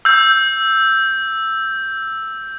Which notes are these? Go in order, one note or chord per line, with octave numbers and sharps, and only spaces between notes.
E6 G6